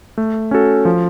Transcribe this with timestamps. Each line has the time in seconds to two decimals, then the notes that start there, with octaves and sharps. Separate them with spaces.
0.18 A3
0.51 C#4 F#4 A4
0.85 F3